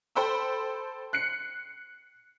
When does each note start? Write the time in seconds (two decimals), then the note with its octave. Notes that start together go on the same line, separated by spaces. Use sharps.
0.16 A4 C5 G5 B5 E6
1.13 F#6 C7 C#7